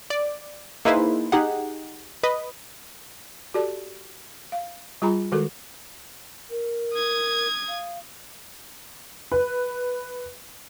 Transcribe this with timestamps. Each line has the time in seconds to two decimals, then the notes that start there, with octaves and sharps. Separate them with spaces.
0.10 D5
0.85 A#3 D#4 E4 G#4 B4 C5
1.32 D#4 G4 G#4 F#5
2.23 B4 D#5
3.54 F#4 G4 A4 D5 A5
4.52 F5
5.02 G3 F4 G#4 G#5 A#5 B5
5.32 D#3 G#3 F#4 A4 A#4
6.50 A#4
6.94 D#6 G#6
7.68 F5
9.32 B4